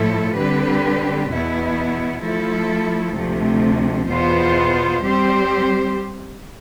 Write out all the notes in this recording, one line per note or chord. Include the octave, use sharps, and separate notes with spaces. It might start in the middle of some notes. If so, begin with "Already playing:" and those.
Already playing: A2 F3 A3 E4 A4
D3 G3 C4 G4 B4
E2 B2 B3 E4
F3 A3 E4 A4
D2 C3 F3 A3
E2 B2 B3 F4 C5
G3 C4 G4 C5